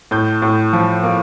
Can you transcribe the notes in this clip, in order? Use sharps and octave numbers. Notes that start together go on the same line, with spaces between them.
A2 G6
A2
F3
A#3